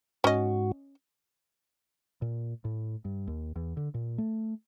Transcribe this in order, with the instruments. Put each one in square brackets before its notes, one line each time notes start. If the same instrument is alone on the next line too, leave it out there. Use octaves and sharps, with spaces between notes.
[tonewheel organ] G#2 F#4 [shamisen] C#4 D#5
[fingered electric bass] A#2
A2
G2
D#2
E2
D3
A#2
A3